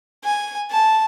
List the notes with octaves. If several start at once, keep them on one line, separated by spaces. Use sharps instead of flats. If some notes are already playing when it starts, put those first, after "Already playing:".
G#5
A5